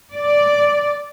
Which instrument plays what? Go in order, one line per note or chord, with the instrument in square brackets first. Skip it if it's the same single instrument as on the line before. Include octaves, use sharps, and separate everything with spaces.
[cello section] D5